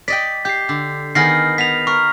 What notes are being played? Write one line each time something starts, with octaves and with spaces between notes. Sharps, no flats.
D5 D#5 G5 B6
G4 G6 C7
D3
D#3 B3 G#4 F6 A#6 C7
B3 B6 F7
A#4 C#6